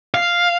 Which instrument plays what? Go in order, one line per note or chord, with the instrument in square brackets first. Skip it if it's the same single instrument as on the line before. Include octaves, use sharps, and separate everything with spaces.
[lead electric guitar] F5